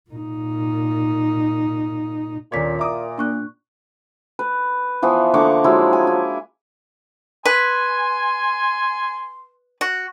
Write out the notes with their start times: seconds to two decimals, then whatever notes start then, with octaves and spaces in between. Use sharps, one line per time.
0.10 A#2 D#4
2.52 D#1 A#1 A#2 C#5 D5 D6 B6
2.79 E5 A#5 D6 D#6
3.18 A#3 D4 C#6 F#6
4.39 B4
5.02 E3 F3 B3
5.34 D3 A#3 C#6 D6
5.64 F3 F#3 G#3 E4
5.93 G#5
6.07 E4
7.46 B4 G#5 C6
9.81 F#4